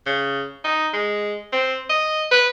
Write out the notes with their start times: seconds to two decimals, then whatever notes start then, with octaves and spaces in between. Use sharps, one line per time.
0.06 C#3
0.65 D#4
0.93 G#3
1.53 C4
1.90 D#5
2.32 B4